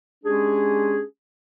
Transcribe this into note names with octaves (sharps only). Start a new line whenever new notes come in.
G#3 C#4 D4 G4 G#4